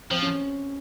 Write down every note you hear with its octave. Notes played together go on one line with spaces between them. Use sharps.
F3 C4
C#4